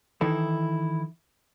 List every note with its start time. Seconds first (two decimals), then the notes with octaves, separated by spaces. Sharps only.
0.21 D#3 E3 D#4 E4 A4